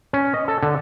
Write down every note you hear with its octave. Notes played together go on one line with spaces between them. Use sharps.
C#4
D#5
A4
D3